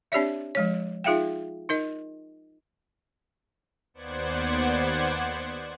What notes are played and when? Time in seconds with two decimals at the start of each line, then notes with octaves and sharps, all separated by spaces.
0.12 C4 D4 G4 C#5 D5 E5
0.55 F3 G#3 C#5
1.04 D#4 F4 G#4 E5 F5 G5
1.69 D#4 A#4 D#5
3.94 D#2 B3 C5 D5 F#5 G#6